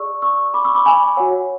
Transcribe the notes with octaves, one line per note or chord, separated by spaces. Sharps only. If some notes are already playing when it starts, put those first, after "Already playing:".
Already playing: G#4 D5 C#6 E6
C#6 E6
B5 D6
C#6 E6
B5 D6
G#5 B5
F#4 C#5 F#5